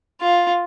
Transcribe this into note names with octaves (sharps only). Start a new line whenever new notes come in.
F4